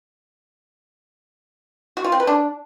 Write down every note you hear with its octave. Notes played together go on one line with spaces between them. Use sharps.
F#4
F4
C4
B4
D4